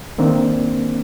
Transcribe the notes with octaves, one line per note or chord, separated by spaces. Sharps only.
D#3 A#3 C4 D4